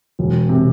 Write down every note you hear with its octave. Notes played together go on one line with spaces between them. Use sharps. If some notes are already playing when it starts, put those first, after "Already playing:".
E1
C3